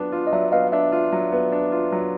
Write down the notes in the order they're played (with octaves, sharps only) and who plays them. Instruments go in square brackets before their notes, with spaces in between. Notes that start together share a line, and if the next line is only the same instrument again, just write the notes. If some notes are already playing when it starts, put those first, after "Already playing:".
Already playing: [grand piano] F#3 B3 D4 F4
F4
[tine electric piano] D#5
[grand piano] F#3 [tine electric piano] D5 E5
[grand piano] B3 [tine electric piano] D#5 F5
[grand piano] D4 [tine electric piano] D5 E5
[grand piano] F4
F#3
B3
D4
F4
F#3